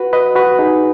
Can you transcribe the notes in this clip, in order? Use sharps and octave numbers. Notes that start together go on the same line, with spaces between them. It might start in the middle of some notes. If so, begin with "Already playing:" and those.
Already playing: F#4 B4
B4 D#5
F#4 B4
D#4 G#4